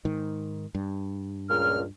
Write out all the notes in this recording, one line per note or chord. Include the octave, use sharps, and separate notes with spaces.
G#2 D#3
G2
C#2 A#2 F6